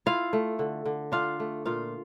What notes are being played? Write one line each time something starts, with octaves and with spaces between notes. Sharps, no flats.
E4 F4 F5
A3
D3
D3
D4 F4 F5
A3
A#2 F4 F5